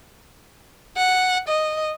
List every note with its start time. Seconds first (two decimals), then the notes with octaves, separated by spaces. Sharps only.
0.96 F#5
1.48 D#5